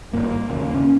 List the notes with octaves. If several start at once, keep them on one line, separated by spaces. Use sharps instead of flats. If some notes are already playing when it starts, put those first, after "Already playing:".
G#1 G2 A#3
F1 D#2 C#3
C#4